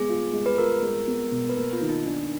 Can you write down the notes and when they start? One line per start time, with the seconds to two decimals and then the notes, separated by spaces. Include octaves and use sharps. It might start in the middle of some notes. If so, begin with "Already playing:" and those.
Already playing: G#3 B3 G#4
0.09 F4
0.33 G#3
0.46 B4
0.58 F4 A#4
0.82 G#3
1.07 B3
1.32 B2
1.49 B4
1.57 A#3 A#4
1.73 F4
1.81 D#3
1.89 D#4
2.06 D#3 D4